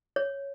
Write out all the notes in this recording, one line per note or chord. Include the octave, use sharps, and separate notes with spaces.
C#5